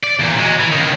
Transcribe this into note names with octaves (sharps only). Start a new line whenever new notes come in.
D5
E2 A#2
F#3 G#3
E3
C#2 D#3